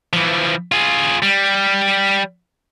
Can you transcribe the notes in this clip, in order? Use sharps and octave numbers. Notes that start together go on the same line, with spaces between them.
E3 F3
F4 G#4
G3